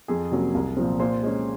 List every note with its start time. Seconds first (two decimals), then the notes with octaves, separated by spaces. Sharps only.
0.08 F2 G#4
0.31 C3 F#3 A#3 C#4
0.54 C2
0.77 A#2 F3 C4
1.00 A#2 C5
1.23 G#3 C#4